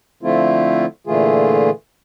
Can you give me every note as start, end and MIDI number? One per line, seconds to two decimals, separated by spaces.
0.23 0.86 50
0.23 0.86 53
0.23 0.86 57
0.23 0.86 60
0.23 0.86 64
0.23 0.86 65
1.07 1.70 46
1.07 1.70 50
1.07 1.70 52
1.07 1.70 57
1.07 1.70 65
1.07 1.70 68